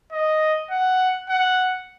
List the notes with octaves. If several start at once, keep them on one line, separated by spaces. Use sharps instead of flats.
D#5
F#5
F#5